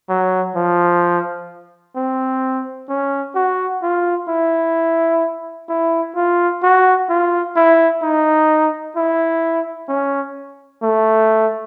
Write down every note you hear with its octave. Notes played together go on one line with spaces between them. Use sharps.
F#3
F3
C4
C#4
F#4
F4
E4
E4
F4
F#4
F4
E4
D#4
E4
C#4
A3